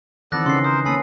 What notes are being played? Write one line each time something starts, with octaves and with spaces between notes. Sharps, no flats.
D#3 E3 B3 C4 A4 D5 F#6 A#6
C#3 C#4 C6 C7
A#4 C5 D#6
A#3 C#4 A4 G#5 B5 D#6 C7